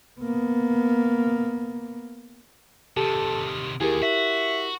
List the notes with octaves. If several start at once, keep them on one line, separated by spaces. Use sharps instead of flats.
A#3 B3
C3 D#3 G4 A4
D#2 E4 G4 G#4 A#4
F#4 E5